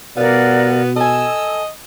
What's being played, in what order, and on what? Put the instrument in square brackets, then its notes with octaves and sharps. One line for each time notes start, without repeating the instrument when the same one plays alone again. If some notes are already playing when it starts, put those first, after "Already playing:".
[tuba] B2 [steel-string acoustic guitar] G3 F5 [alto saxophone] B3 [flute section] A#4 D5 F#5
[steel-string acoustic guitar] A4 G#5 [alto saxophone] D#5 [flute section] E6